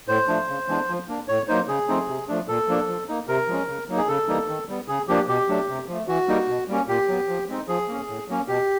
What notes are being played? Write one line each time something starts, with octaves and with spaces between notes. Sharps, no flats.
A2 C5
F3 A3 D4
C#3
E3 G#3 B3 D4
F3
A#3 D4
A2 C#5
F#3 A#3 D#4 C5
C#3 G#4
F3 A3 C4 D#4
C3
F3 A3 D4
A#2 A4
F3 A#3 D4
F3
A#3 D#4
C3 A#4
F3 G#3 C#4
C#3
F#3 A#3 D#4
G#4
C#3 A4
E3 G3 A#3 D#4
D#3
G3 B3
C#3 G#4
F3 A#3 D4 G4
B2 G4
F#3 A3 D4
C3
F3 A3
E3 F#4
G3 A#3 D#4
B2
G3 A#3 C#4
A#2 G4
F#3 B3
F3
G#3 C4 D#4
F3 G#4
A#3 C#4
A2
F#3 A#3 C#4
B2 G4